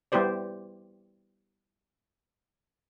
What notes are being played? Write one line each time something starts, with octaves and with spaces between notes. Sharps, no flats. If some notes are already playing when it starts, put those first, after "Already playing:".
G3 B3 E4 G4 C5 D5